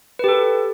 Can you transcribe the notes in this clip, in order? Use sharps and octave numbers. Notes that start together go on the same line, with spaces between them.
G4 A4 B4